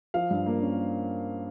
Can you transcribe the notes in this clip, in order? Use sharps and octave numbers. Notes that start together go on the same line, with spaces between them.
F3 F5
G2
A#3
C#4